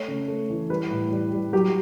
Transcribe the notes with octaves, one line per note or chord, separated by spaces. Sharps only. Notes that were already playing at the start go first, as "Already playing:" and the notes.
Already playing: A3 C#5
C#3
A3
E3
G3 B4
A2
G3
G3
F#3 G4